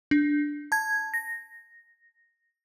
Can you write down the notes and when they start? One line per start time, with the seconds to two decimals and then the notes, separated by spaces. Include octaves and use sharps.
0.11 D4
0.72 A5 G#6
1.14 A#6